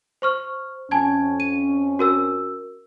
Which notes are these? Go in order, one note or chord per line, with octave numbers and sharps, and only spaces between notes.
C5 C#6 F6
F2 C#4 G#5 A5 G#6
D#7
F#4 A#4 E6